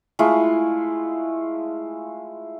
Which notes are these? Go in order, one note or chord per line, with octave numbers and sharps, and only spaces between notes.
G#3 A3 E4 F4